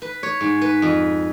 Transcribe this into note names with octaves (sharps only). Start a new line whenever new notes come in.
B4
C#5
G#2
B4
F2